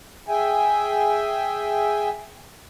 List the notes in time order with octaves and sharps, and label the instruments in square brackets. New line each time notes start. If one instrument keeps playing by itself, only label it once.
[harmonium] G#4 E5 G5 G#5